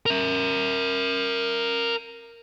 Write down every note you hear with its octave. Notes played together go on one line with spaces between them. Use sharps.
A#4 E5